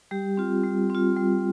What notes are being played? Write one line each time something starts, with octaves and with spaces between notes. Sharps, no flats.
G3 G4
C4 F4
G3
C4 F4
G3